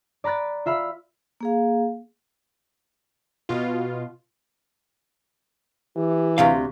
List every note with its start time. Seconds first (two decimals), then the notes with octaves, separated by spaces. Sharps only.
0.24 D5 A#5 B5 F#6 A6
0.66 F4 E5 F5 B5
1.41 A#3 G#4 F5
3.49 B2 F4
5.96 E3 G4
6.38 D2 C3 F5